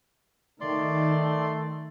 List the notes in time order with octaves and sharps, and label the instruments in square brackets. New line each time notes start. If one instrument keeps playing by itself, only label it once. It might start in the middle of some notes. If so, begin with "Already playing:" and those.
[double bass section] D#3 [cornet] A3 [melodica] D5 C6